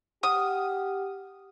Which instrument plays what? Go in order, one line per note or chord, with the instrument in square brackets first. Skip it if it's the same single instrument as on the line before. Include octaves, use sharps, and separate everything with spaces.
[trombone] G4 [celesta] F#5 F6 [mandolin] D#6